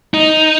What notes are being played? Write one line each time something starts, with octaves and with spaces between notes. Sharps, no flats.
D#4